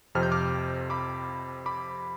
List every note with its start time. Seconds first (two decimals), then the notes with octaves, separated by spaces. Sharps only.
0.15 F2 C3 F3 F6
0.23 G6
0.32 D6 F6
0.90 B5 D6
1.66 B5 D6